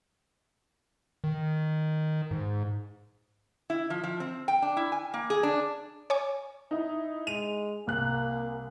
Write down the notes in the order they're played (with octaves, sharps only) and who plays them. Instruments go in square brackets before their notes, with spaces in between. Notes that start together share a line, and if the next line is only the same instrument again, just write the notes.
[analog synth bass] D#3
G#2
[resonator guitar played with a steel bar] E4
F3
F3
C4
G5
D4
E4
G#5
A#3
G#4
D4
[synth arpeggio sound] C#5 G#5 D6
[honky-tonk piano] D#4 E4
[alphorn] G#3 [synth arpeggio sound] D#7 [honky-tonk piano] F7
[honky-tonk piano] C2 F#6 [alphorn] A#3